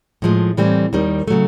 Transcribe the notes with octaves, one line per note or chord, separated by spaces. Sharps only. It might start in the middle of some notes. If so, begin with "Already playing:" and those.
A2 F3 G#3
A2 E3 G3 C4
D#2 D#3 G3
C#3 F#3 A3